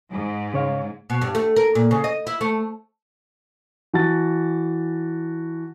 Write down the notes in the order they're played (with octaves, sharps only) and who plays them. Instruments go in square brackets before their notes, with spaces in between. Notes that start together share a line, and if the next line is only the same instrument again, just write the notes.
[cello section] G#2
[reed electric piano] C#3 C#5 F5
[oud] B2
G2
A3
A#4
A#2
C#3
D#5
E4
A3
[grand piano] E3 F#4 A5 A6